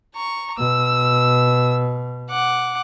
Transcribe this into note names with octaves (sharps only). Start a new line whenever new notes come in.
A#5 C#6
B2 E6
F#5 D6